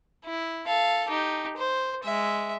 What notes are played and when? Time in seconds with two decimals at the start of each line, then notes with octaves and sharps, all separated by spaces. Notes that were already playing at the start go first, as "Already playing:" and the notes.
0.25 E4
0.67 A4 F5
1.09 D#4 G4
1.57 C5
2.03 G#3 E5